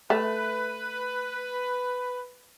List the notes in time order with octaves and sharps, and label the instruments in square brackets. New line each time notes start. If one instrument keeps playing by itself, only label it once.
[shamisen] A3 [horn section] B4